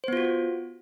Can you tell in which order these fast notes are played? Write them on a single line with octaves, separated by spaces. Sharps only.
C5 B3 F4 F#4